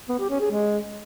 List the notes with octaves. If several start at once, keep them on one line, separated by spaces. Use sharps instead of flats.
B3
G4
C#4
G#4
G#3